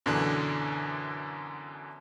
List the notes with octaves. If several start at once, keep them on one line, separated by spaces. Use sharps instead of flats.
F#2 B2 D3 E3 D4